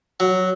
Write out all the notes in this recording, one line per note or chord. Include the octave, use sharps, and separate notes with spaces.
F#3